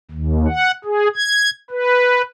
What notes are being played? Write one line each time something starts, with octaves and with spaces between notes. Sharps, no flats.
D#2
F#5
G#4
G#6
B4